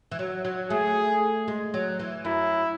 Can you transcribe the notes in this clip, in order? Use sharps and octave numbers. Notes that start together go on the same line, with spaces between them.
E3
F#3
F#3
A3 G#4
G#3
F#3
E3
F#2 E4